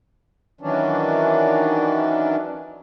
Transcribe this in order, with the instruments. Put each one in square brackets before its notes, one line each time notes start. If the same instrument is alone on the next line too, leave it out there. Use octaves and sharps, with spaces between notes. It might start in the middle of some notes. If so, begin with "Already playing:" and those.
[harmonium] D#3 E3 F#3 C#4 D4